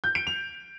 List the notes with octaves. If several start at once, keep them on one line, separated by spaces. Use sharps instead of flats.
G6
D7
F7